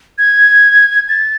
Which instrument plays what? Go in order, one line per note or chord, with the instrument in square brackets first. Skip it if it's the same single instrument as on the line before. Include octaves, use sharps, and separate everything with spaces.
[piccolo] G#6
A6